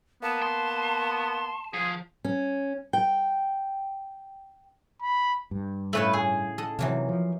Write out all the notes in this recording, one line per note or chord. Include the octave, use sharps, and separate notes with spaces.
A#3 B3 A5
B3 C6
F3 G#4
C#4
G5
B5
G2
A2 C#3 A3 B4 C#5 E6
G#4
A4 D#5 F#5
C3 E3 F#3 A#3
F3